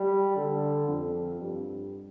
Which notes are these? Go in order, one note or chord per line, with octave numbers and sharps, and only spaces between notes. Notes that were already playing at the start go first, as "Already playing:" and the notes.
Already playing: G3
D3
F2
G2